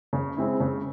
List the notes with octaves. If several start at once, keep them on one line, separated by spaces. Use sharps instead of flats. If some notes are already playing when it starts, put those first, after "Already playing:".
C#3
G#3 C4 E4
C#3